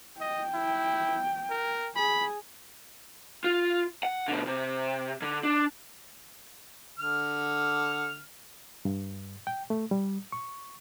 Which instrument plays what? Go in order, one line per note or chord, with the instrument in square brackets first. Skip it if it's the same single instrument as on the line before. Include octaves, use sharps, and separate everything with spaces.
[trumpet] D#5 [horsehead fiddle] G5
[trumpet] E4
A#4
[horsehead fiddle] G#4 [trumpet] B5
[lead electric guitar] F4
F#5
B2 D3
C3
D3
D4
[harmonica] D3 F6
[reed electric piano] G2
G5
A3
G3
C#6